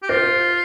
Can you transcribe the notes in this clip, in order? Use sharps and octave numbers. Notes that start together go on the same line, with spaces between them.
G4
F4 C5